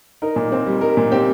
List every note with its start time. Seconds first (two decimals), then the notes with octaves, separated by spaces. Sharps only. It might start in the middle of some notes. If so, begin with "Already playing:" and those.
0.22 D#4 A#4
0.36 A#2
0.52 C4
0.66 G3
0.81 D#4 A#4
0.97 A#2
1.11 C4 G4